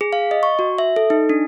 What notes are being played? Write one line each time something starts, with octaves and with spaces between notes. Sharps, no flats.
G#4
F5
D#5
C#6
F#4
E5
A4
D#4
D4